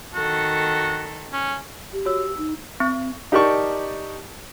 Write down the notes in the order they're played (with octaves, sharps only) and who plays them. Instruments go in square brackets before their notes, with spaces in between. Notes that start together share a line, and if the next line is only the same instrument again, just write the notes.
[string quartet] D#3 A4 [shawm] F#4
[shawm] C#4
[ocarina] G4
[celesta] F#4 C#5 E6
E6
[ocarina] D#4
[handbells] C4
[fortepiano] D#4 G4 A#4 D5 A5 C#6